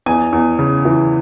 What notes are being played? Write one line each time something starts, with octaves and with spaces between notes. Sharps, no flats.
E2 G#5
E2
C#3
E3